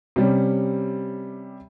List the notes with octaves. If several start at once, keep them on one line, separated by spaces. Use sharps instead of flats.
C3 G3 C#4